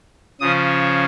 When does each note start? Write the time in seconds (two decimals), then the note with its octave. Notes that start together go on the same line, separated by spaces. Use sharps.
0.40 C#3 F3 C#4 D#6